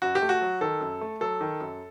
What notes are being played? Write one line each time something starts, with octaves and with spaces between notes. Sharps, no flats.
F#2 F#4
G4
A3
F#4
F#3
D#3 A4
F#2
A3
F#3 A4
D#3
F#2